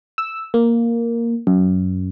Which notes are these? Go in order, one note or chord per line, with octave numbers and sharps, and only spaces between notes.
E6
A#3
F#2